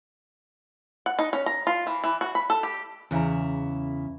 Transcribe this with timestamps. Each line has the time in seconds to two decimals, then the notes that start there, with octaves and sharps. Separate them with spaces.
1.06 F#5
1.19 D#4
1.33 C#4
1.46 A#5
1.67 F4
1.87 E3
2.04 E3
2.21 F#4
2.35 B5
2.50 A4
2.63 G4
3.11 E2 C#3 E4 A#5